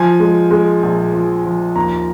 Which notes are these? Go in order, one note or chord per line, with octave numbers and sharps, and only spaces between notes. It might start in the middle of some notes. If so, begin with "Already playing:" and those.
Already playing: F3 G#5
G#3
G#3
A#1
F3
F3
D#2 A#5